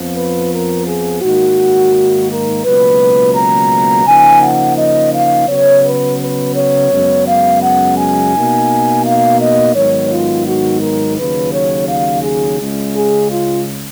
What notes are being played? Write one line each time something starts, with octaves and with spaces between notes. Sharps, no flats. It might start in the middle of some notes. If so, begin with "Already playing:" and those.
Already playing: F2 F3 B3 F4
B4
A#4
G#4
G#2 D#3 A#3 F#4
A#4
C#2 B2 F#3 A#3 B4
A#5
C#3 F3 A#3 D#4 G#5
F#5
D#5
F5
C#3 F#3 B3 C#5
B4
B4
C#5
F#2 C#3 G#3 B3
F5
F#5
G#5
B2 A#3 D#4
F5
D#5
G#2 D#3 F#3 B3 C#5
F4
F#4
A#4
D#2 C#3 F#3 B4
C#5
F5
G#4
C#2 C#3 G#3
G#4
F4